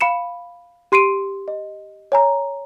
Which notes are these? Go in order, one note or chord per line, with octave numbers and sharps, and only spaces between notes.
F5 B5 C#7 E7
G4 C6 C7 D7 D#7
D#5
C#5 G#5 A#5